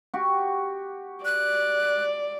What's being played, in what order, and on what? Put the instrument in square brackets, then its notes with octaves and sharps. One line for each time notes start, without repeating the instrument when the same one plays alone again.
[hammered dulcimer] F#4 G4
[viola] D5 [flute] F#6